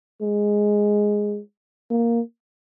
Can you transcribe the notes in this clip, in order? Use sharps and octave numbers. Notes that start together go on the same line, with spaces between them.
G#3
A#3